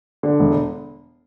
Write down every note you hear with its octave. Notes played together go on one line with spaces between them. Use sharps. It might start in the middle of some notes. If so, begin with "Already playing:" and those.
D3
E1